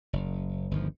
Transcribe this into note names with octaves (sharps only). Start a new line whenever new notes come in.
F#1
G1 D2 D#3 F3